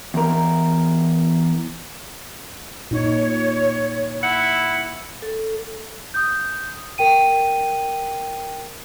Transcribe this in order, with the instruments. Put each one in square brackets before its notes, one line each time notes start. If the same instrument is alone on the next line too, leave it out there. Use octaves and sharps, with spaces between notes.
[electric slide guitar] E2 A#4
[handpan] A#2 D#4 [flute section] C#5
[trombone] E4 [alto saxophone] F#5
[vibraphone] A4
[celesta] D#6 G6
A#4 G5 D#7